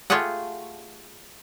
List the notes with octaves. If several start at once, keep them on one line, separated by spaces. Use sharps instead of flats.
A3 F4 G4 G#4 F#5